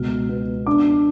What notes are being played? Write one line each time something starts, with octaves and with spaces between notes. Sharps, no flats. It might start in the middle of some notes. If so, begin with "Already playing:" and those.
Already playing: C#2 B2 G#3 F6
B3
D4 D6